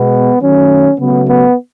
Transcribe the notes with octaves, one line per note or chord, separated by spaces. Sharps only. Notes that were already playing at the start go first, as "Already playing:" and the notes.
Already playing: B2 G#3 B3
D#3 F#3 A3 C#4
C#3 F#3 A3 B3
B3